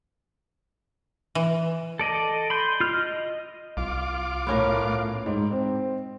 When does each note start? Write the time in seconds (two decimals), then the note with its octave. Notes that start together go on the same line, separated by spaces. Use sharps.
1.35 E3
1.99 A4 D5 D#5
2.50 B5 C6 G6
2.80 F4 F6
2.93 D#5
3.77 C2 F4 D6
4.47 A2 B3 C#4 A#4
5.26 G#2
5.52 C4